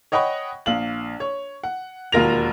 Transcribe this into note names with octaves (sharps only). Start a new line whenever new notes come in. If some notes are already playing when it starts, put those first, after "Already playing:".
C#5 D#5 F#5 G5 B5 C#6
A#1 F5 F#7
C#5
F#5
E1 D#2 F4 A#4 A#6 F7